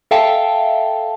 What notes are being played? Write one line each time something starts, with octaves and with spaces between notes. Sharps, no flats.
A4 E5 F5 G5 A5